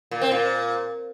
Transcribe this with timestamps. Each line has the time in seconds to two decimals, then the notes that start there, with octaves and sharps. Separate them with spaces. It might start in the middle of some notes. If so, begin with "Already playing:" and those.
0.11 A#2
0.21 C4
0.32 A#2